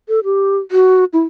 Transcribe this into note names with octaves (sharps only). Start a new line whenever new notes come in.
A4
G4
F#4
E4